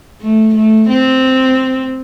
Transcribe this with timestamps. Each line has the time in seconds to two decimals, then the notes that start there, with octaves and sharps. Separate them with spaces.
0.21 A3
0.54 A3
0.89 C4